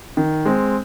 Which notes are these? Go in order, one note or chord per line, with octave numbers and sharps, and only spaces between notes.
D#3
G#3 C4